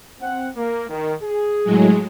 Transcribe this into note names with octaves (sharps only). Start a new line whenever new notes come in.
C4 F#5
A#3
D#3
G#4
A2 F#3 G#3